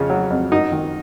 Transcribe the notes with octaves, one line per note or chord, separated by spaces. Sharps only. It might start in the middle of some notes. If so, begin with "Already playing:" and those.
Already playing: F2 C#3
F#3
F2
F#2 D#4
D#3